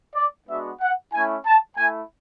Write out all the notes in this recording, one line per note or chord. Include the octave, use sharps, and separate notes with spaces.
D5
G#3 B3 D4 F#4 E5
F#5
A3 C#4 E4 G#5
A5
A3 E4 G#5